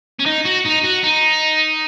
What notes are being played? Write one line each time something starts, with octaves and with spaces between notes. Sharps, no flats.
C#4
D#4
F#4
D#4
F#4
D#4